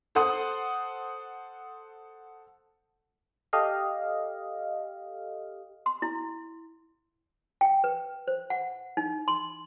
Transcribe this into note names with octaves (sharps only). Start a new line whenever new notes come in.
A4 C5 F#5 C6 D#6
G4 A4 D#5 F5
C6
E4
G5
B4
C5
F#5
D#4
C6